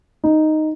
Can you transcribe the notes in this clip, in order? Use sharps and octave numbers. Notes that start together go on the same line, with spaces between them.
D#4